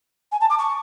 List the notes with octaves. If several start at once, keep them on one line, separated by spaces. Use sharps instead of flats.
G#5
A5
D6
C#6